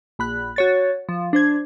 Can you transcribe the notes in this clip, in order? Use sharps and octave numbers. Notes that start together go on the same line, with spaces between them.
A#1 B5 F#6
F#4 C#5 A6
F3
D4 C5 G#6